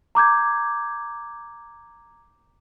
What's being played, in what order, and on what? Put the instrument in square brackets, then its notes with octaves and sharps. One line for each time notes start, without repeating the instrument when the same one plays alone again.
[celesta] A#5 D6 G6 G#6